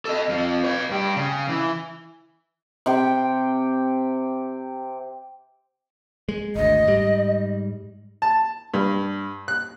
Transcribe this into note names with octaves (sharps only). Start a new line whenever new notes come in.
A4 D#5
F2 F3
B4 C#5
G2 G4
C#3
E3
C3 G4 G5
G#3
G#1 D2 D#5
G#2 G3
A5
G2
F#6